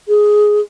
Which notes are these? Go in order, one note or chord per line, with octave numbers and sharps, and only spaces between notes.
G#4